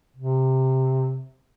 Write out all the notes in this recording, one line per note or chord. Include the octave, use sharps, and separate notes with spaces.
C3